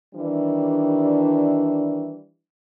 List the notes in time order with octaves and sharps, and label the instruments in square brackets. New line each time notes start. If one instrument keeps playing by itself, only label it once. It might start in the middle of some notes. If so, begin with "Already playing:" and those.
[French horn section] D#3 E3 G3 D4